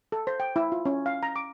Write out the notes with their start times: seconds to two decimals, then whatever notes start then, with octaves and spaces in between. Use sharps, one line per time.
0.12 A4
0.27 C5
0.40 G5
0.56 E4
0.72 F4
0.85 C#4
1.06 F5
1.23 A#5
1.36 D6